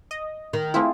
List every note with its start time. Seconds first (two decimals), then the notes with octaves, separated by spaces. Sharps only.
0.11 D#5
0.53 D#3
0.74 A3 C4 E4 F4 G#4